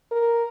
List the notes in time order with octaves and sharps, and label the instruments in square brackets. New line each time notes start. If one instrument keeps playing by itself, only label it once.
[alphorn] A#4